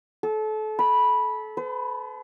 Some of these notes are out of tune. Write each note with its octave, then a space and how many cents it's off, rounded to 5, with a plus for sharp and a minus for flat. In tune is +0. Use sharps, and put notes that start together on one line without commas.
A4 -30
B5 -10
B4 +45